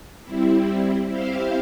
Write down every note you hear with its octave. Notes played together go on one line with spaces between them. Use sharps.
G3 C4 E4
C4 E4 G4 C5 F5